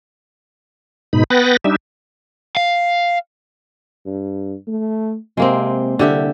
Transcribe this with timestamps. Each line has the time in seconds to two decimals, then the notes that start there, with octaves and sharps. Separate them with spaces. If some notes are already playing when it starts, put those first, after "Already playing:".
1.13 G#2 B2 D#4 B5
1.30 B3 B4 F#5 G5 A6 A#6
1.64 G3 D4 D#4 E5
2.57 F5
4.06 G2
4.67 A3
5.37 C3 G#3 A#3 C4
5.99 C2 D3 G4 E5